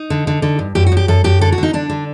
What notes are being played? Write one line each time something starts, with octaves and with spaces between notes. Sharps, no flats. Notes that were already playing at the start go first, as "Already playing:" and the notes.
Already playing: D#4
D3
D3
D3
G2
F#2 G4
F#4
F#2
G4
F#2 A4
F#2 G4
D3 A4
F#4
D3 D#4
D3 D4
D3